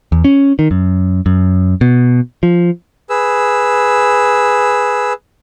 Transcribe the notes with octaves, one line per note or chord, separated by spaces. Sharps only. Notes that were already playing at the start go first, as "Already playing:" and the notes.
E2
C#4
D#3
F#2
F#2
B2
F3
G#4 B4 E6